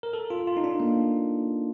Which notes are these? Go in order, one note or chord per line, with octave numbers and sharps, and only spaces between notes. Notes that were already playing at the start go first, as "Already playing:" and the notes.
A#4
A4
F4
F4
D#4
D4
A#3